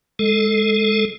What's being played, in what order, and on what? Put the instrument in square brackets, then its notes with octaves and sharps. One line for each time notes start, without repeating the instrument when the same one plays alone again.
[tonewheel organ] G#3 A4